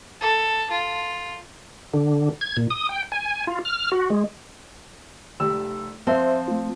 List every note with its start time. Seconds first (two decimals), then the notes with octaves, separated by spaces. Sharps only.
0.21 A4
0.71 F4
1.94 D3
2.41 G#6
2.57 A#2
2.70 D#6
2.89 G5
3.12 G#5
3.47 F4
3.65 F6
3.92 F#4
4.10 G#3
5.40 F1 G3 E6
6.07 F3 C4 C5 E5
6.48 A3 F4